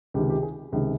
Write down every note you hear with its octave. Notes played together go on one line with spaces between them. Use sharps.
C#2 C3 D#3 G4
G4
G#4
C#2 C3 D#3